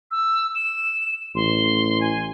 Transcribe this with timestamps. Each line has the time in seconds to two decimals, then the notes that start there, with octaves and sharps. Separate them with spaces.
0.11 E6
0.55 E7
1.35 A1 C6
2.00 G#5